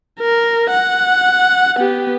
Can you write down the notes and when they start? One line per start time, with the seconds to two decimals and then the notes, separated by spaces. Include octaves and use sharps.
0.20 A#4
0.71 F#5
1.78 B3 G4